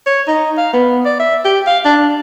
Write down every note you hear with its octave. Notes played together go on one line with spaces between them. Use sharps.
C#5
D#4
F5
B3
D5
E5
G4
F5
D4